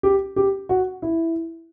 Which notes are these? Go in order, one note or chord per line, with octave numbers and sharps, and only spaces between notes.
G4
G4
F#4
E4